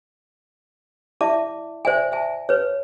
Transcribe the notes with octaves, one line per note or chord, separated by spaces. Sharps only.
E4 D5 E5 A5 D6
C5 D5 E5 G#5
E5 G#5 A5
B4 C#5